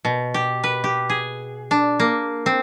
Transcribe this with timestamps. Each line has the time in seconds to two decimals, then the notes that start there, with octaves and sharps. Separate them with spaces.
0.05 B2
0.34 G4
0.64 B4
0.84 G4
1.09 G#4
1.71 D4
2.00 A#3
2.46 C4